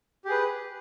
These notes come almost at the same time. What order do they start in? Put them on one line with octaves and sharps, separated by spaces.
G4 G#4 B4